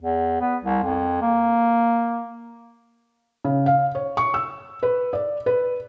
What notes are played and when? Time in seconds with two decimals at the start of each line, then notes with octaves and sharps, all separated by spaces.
0.02 E2
0.41 B3
0.64 C2
0.84 F2
1.22 A#3
3.44 C#3
3.66 F5
3.95 C#5
4.17 C#6
4.34 E6
4.83 B4
5.13 D5
5.46 B4